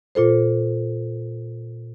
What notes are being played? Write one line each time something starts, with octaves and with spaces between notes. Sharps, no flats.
A#2 F4 A4 C5